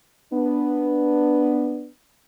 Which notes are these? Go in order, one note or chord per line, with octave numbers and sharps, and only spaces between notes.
B3 D4